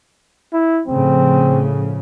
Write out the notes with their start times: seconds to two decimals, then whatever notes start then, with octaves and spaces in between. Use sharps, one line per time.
0.53 E4
0.88 A2 C#3 F3 C4